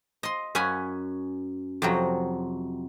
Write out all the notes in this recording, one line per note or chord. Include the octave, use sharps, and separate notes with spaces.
D#5 C6
F#2 C#4 F#5 G#5 B5
F2 C3 F#3